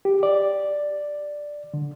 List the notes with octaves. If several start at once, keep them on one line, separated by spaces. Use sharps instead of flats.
G4
D5
D3